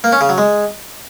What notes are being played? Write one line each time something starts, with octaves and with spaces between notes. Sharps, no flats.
A#3
C#4
C#3
F#3
G#3